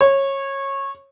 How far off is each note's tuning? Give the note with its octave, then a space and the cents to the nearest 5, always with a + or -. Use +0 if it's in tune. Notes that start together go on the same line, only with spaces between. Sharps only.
C#5 -20